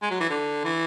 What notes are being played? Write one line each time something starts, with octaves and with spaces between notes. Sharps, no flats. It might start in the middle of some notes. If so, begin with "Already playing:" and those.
G#3
F#3
E3
D3
E3